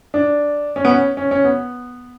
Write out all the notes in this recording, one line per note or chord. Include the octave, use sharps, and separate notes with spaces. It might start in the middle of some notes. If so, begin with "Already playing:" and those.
D4
C#4
B3
C#4
C#4
C#4
B3